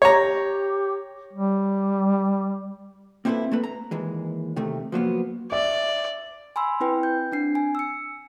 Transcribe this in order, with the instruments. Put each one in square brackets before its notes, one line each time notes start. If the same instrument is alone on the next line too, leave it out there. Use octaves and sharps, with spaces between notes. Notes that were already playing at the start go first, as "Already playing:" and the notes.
[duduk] G4 [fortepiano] C#5 A#5
[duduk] G3
[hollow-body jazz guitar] A#3 C4 E4 G#4 A4 B4
A3 A#3 A4 B4
A#5
D#2 E3 G#3
C3 D#3 A3
F3 F#3 A#3 B3
[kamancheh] D5 [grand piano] E5
[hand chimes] G#5 B5 C6 E6
C4 E4 B4 G5
G6
C4 D4 C7
G#5
E6 C#7